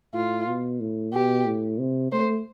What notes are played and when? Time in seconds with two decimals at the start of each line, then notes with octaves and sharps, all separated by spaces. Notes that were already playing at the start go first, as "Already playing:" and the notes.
0.13 A2 F4
0.47 B2
0.80 A2
1.13 B2 G4
1.46 A2
1.79 C3
2.12 A3 C5